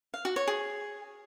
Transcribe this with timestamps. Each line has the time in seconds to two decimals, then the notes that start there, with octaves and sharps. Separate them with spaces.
0.14 F5
0.25 F#4
0.36 C#5
0.47 G#4